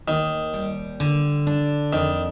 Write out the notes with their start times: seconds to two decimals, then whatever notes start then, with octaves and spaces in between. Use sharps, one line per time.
0.08 D#2 D#3
0.54 G3
1.00 D3
1.47 D4
1.93 F2 D#3